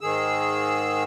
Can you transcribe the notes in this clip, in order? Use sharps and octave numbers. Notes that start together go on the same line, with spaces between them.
G#2 D#3 G#4 E6